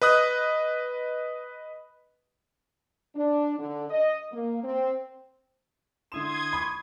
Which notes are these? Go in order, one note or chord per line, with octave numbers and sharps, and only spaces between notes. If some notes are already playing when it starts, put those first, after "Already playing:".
B4 D#5 D#6 F#6
D4
D3
D#5
A#3
C4
D3 E4 C6 D#6 G#6 E7
B5 C#6